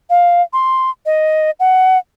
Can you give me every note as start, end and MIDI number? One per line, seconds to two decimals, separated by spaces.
0.10 0.42 77
0.53 0.90 84
1.06 1.51 75
1.60 1.98 78